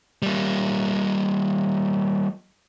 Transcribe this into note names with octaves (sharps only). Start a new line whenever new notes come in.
G3 A#3